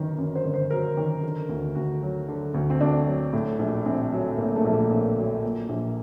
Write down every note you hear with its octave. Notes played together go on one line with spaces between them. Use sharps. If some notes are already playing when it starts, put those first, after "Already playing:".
Already playing: G1 F#2 D#3 F#3 A#4
F#2
C5
G1
C5
F#3 A#4
D#3
D3
D2
D2 F#4
F#3
D3
D2
C4
D2 D4
F#3
A2
A#1
A#1 C4
F#3
A2 A#3
A3
A#1
A#3
A#1
F#3
A#2
A#1